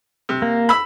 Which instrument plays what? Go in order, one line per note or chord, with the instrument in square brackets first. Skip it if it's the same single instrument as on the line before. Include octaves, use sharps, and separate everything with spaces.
[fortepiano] C3
[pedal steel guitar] A#3
[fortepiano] B5 E6